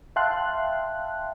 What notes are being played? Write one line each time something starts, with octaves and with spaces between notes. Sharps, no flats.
E5 F5 G5 A5 C6 F#6